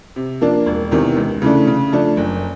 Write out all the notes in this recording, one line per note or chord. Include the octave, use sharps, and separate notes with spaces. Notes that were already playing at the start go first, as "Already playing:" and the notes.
C3
F3 A#3 D4
E1
E2 C3 D#3
C#2
C#3 E3 A3 D4
C#3
F3 A3 D4
F#1